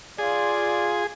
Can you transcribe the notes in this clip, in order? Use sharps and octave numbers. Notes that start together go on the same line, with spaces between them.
F4 G#4 D5